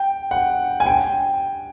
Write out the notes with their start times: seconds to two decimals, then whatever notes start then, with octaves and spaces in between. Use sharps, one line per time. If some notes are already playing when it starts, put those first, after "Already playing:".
Already playing: G5
0.31 F#5
0.80 G#5
0.86 G5